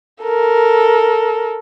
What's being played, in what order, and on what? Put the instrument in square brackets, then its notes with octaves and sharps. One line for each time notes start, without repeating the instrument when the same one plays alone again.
[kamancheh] A4 A#4